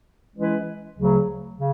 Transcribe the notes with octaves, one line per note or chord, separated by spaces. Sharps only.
E3 G#3 C#4 E4 B4
D2 C#3 F#3
C#3